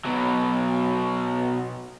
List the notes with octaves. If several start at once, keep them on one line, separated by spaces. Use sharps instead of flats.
B2 F#3